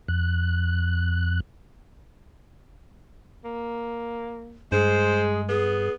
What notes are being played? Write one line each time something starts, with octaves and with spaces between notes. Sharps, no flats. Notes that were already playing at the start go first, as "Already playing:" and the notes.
F2 F#6
A#3
G2 G#3 G#4 C5
B3 G#4